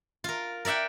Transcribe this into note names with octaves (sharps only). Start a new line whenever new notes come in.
F4 A#4
A#4 D5 E5 F#5 G5